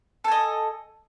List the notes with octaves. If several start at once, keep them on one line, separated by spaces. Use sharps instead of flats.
A4 D#5 G#5